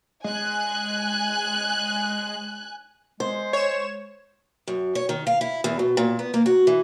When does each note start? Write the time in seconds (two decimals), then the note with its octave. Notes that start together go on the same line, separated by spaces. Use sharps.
0.24 G#3 G#5 F#6
3.20 G#3 C5
3.53 C#5 E7
4.67 F#2
4.95 C#5
5.09 D#3
5.27 F5
5.41 E4
5.64 E2
5.79 B2
5.97 A#2
6.19 B3
6.34 A#3
6.46 F#4
6.67 E3